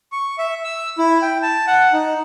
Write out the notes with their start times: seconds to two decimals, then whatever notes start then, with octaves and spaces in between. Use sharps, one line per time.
0.12 C#6
0.38 E5
0.64 E6
0.98 E4
1.22 G5
1.42 A5
1.67 F#5
1.93 D#4